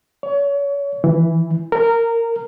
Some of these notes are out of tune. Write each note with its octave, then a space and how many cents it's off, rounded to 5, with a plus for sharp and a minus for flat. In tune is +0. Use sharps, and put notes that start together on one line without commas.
C#5 +30
E3 +0
A#4 -15